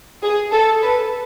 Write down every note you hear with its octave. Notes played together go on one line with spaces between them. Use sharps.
G#4
A4
B4